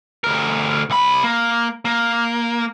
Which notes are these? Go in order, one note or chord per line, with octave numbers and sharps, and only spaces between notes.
D2 A#4
C2 B5
A#3
A#3